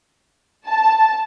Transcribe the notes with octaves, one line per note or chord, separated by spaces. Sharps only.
A5